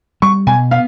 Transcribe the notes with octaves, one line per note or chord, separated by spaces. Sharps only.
G3 C#6
B2 G#5
B3 F5